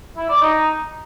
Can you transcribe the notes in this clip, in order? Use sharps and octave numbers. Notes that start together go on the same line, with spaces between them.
E4
D5
D#4